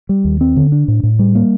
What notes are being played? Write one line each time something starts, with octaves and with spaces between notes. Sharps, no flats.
G3
D#2
C4
D3
D4
A2
A2
G3
A#3